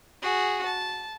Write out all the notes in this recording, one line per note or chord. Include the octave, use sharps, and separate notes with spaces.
F#4 G#4
A5